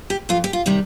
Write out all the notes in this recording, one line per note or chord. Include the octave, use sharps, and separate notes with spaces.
G4
F2 F4
G4
F4
C3 D#3 G3